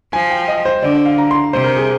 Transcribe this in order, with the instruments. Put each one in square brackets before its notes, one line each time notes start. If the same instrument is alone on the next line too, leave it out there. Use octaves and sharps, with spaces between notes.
[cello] F3 [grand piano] G#5
[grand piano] G5
D#5
C5
[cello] D3 [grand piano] D5
[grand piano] D5
F5
A#5
C6
A#5
[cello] C3 [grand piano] C5
[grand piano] A#4
G#4